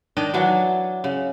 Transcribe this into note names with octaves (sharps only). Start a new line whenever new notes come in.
D#3 D4 D#5
E3 F#3 D4
C#3